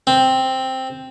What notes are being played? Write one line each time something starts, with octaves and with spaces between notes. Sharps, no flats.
C4